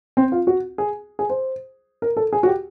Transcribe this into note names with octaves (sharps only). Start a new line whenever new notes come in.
C4
F4
F#4
G#4
G#4
C5
A#4
A4
G#4
F#4
G4